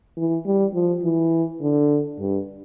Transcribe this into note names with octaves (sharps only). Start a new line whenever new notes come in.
E3
G3
F3
E3
D3
G2